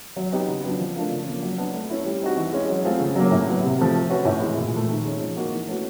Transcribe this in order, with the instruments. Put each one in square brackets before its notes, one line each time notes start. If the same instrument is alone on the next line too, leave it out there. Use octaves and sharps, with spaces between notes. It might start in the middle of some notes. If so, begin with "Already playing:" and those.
[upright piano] F#3
B3 D#4 G4
C#3
F#3 B3 D4 F4
F3
A3 D4 F4 A#4
C#3
F3 A#3 C#4
F#3
B3 D4
A3
C#4 E4
G3
C4 D#4 F#4
E3
G#3 C#4
F#3
A3 C4 F4 G#4
C#3
F#3 A#3
A2
F#3 B3
C3
F3 A3
A3
C#4 F#4 B4
A2
E3 G#3
A#2
F3 A3
D#3
G#3 C#4
F3
A#3 D#4 F#4 A#4
E3
A3 C#4 F#4 B4